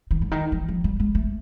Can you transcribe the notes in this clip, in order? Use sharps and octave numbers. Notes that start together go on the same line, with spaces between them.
D#3
D3
D#3
E3
F3
G3
G#3
A3